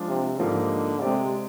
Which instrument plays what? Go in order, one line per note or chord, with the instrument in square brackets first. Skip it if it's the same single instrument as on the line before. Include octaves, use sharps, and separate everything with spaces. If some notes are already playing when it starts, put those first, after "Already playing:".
Already playing: [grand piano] F3 G#3 D4 F4
[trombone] C3
[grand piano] G#2 F3 A#3 D#4 G4 [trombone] D3
[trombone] C3 [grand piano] G#3 C4 G4 D5